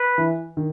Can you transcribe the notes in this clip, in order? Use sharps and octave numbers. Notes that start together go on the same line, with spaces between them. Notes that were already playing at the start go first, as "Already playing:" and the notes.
Already playing: B4
E3
D#3